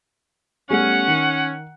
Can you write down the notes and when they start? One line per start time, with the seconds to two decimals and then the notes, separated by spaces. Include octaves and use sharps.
0.70 G3 A3 B3 C#4 F#5
1.08 D#3